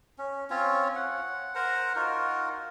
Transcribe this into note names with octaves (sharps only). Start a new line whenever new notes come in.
C#4
C4 C#4 F4 C#5
F#5
A#4 C5 F#5 A#5
D#4 F4 F#4 A#4